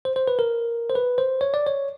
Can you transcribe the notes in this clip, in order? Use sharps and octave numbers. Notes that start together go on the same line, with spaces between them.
C5
C5
B4
A#4
C5
B4
C5
C#5
D5
C#5